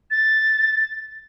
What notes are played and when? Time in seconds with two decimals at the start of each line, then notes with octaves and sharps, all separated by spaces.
0.11 A6